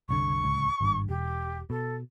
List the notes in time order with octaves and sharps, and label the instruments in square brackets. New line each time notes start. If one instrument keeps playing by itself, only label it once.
[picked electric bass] F#1 C2 D3 [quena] C#6
[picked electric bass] D1 C#2
G#1 G2
[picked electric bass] E1 [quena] G4
[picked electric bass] B2 [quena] A4